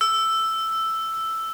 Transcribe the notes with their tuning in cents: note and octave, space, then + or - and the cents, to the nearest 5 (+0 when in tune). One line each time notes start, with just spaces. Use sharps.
E6 +5